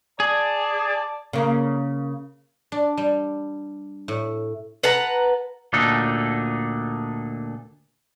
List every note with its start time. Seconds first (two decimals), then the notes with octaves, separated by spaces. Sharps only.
0.20 G#4 D5 A5
1.33 C#3 A#3
2.72 D4
2.97 G3
4.08 A2
4.83 B4 F#5 A5 A#5
5.73 D2 A#2 D4 D#4 A4